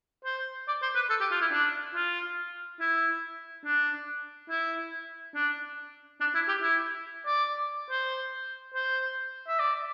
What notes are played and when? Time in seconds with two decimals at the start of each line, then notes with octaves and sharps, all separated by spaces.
0.24 C5
0.68 D5
0.82 C5
0.95 B4
1.10 A4
1.21 G4
1.31 F4
1.41 E4
1.52 D4
1.95 F4
2.80 E4
3.66 D4
4.50 E4
5.35 D4
6.20 D4
6.34 E4
6.48 G4
6.62 E4
7.26 D5
7.90 C5
8.74 C5
9.48 E5
9.59 D5